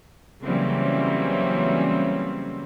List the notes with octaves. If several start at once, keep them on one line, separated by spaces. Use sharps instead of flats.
C#3 E3 F#3 G3 A#3 C4